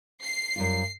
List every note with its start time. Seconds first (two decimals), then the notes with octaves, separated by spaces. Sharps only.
0.23 C7
0.56 F#2 G3 F4